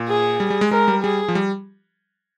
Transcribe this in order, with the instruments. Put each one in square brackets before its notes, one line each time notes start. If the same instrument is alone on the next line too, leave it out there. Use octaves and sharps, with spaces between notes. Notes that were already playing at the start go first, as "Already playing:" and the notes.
Already playing: [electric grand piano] A#2
[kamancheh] G#4
[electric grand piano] G3
G3
G#3
[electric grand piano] G#3 [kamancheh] A#4
[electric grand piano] G3
[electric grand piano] G3 [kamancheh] G#4
[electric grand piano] F3
G3